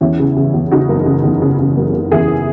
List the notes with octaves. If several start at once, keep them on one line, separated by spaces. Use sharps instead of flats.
E2 C#4 E4
C#3
C#3
E2
C#3 D#4 F#4
F#1
C#3
E2
C#3
C#3
F#1
F#1
E2 E4 G#4